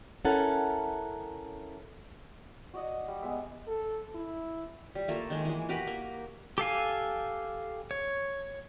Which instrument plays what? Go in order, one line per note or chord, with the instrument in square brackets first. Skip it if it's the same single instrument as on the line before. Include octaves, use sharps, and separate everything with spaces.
[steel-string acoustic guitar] C#4 E4 A4 A#4 F#5 A5
[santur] F#4 D5 D#5 F#5
G3
G#3 B3 E5
[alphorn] A4
E4
[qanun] G3
A3 A#3 F4 A4
D#3 G#3
E3 G#3
F#4 G4 A#4 B4
A#3
[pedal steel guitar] G4 A4 F5 G#5
C#5